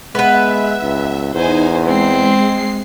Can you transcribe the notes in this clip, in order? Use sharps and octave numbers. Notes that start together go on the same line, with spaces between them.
G#3 B3 B4 E5
C#2
E2 D#4 C5 G#5
G#3 C4 C7